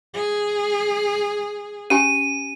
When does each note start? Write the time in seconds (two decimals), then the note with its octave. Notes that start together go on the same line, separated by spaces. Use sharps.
0.14 G#4
1.90 C#4 G4 G#5 D#7